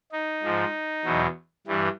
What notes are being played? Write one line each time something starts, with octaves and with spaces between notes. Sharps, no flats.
D#4
G#2 F3
E2 B2 F#3
G2 E3 G3